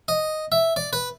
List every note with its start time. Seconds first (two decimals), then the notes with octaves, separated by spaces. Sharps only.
0.08 D#5
0.52 E5
0.76 D5
0.93 B4